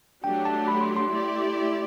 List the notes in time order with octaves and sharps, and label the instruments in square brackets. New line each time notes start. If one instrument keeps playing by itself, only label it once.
[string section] F#3 A3 D4 G4 [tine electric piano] G5
[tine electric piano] A5
B5
C6
C6
[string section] A3 E4 G4 D5